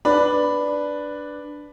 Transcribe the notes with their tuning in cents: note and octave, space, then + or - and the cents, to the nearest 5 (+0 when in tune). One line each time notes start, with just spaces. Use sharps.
D4 +0 B4 +0 B5 +0